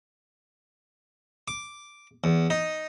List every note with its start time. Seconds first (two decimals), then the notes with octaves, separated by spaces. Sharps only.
1.48 D6
2.24 E2
2.50 D#4